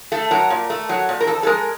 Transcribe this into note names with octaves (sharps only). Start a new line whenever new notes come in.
A3 A4
F#3 A#4
A#2
A3
F#3
A#2
A#4
F2 A4
A4
G#3 A#4